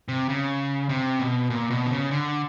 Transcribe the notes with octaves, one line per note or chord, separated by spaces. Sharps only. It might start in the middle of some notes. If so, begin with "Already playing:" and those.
C3
C#3
C3
B2
A#2
B2
D3
C#3
D3